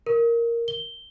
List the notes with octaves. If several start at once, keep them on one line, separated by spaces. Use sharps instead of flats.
A#4
G7